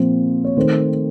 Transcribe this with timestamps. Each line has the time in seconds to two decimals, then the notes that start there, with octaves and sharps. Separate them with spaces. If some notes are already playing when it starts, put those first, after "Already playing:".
Already playing: A#2 F3 C4
0.44 C#5
0.57 D#3 A3 C4 C5